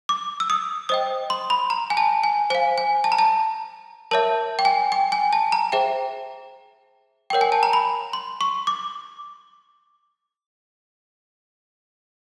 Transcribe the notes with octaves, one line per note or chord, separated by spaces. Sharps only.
D6
E6
D#6
C5 D#5 G5 D#6
C6
B5
A#5
G#5
A5
G#5
C5 F5 G#5
G#5
A5
A#5
A5
A#4 C#5 E5 A5
G5
G#5
G5
G#5
A5
A#5
G#4 C5 E5 G5
A#4 C#5 F#5 G5
G#5
A5
A#5
B5
C6
C#6
D6